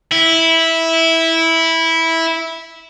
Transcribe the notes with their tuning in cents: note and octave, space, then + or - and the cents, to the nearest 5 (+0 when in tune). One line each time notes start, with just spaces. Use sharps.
E4 -10